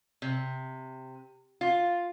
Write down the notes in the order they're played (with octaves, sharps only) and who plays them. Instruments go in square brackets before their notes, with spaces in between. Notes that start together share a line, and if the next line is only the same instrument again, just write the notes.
[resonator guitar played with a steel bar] C3
F4